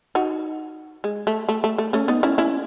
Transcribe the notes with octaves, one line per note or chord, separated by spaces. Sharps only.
D#4 F#4
G#3
A3
A3
A3
A3
A3 C#4
B3 D#4
C#4 E4
C#4 E4